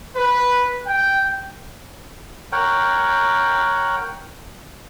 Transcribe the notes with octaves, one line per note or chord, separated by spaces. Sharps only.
B4
G5
A#4 C#5 F#5 G5